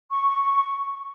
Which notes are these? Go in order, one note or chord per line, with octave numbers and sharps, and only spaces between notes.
C#6